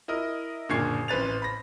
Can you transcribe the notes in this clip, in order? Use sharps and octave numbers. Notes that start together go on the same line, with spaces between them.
E4 A#4 D#5
F#1 A#2 D3 C#6 G#6 C7
A1 C4 B4 A6 F7
B5 A#6